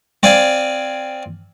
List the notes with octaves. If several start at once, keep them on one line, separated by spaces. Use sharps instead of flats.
C4 D5 F5 G#5